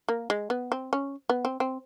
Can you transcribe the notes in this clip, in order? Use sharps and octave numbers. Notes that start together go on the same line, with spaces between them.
A#3
G#3
B3
C4
C#4
B3
C4
C4